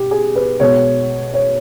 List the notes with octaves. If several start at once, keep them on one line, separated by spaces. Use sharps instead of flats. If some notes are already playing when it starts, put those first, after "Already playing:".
Already playing: B2 G4
G#4
B4
B2 G#3 C#5
C#5